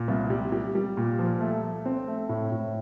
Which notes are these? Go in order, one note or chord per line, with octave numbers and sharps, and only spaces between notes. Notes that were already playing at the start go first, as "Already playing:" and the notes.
Already playing: A#2
C2
G3
G3
G3
A#2
F3
A3
A3
C4
A3
A2
A2